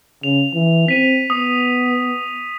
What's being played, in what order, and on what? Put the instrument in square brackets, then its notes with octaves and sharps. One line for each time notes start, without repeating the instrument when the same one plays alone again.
[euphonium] C#3 [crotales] F7
[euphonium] E3
[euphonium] C4 [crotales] B6 D#7 F7
[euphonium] B3 [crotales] D#6